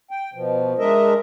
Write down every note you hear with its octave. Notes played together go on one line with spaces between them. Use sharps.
G5
B2 F3
G#3 D4 A#4 D#5 E5